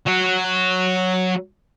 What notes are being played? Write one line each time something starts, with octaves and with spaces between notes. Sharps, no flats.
F#3 F#4